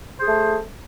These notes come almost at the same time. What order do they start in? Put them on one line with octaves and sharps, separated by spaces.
C5 G#4 A3